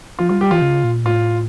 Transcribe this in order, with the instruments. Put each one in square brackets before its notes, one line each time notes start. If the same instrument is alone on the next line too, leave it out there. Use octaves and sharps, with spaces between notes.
[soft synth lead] F3 [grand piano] F4
[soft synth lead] G3 [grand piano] F4
[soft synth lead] G3 [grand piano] G4
[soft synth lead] E3 [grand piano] F4
[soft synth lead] C#3
A#2
[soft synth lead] A2 [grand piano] F4